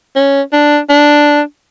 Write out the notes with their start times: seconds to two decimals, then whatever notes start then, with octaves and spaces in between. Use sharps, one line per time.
0.15 C#4
0.53 D4
0.89 D4